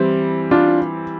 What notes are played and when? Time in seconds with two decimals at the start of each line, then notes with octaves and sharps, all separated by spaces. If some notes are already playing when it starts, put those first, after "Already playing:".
Already playing: E3 G3 C4
0.51 D4 F4